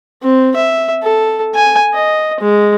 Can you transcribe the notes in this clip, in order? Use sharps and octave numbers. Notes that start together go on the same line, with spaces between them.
C4
E5
A4
G#5
D#5
G#3